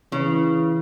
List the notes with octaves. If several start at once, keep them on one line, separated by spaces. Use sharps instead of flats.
C#3 E3